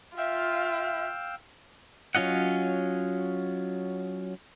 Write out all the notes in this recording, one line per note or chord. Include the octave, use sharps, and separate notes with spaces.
F4 E5 F5 G5 E6
F#3 C#4 F4 D#5 F#5